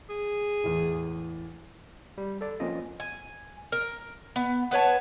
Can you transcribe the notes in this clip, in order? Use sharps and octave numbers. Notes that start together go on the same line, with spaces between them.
G#4
E2 A2
G3
A4 D5
F3 A#3 C4 C#4 F4 D#5
G#5
A#4
B3
B3 B4 C#5 A5